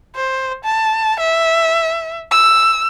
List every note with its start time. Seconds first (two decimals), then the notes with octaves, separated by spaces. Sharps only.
0.16 C5
0.64 A5
1.20 E5
2.31 E6